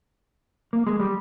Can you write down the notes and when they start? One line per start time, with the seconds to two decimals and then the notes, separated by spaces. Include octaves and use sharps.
0.73 A#3
0.87 G#3
1.00 G3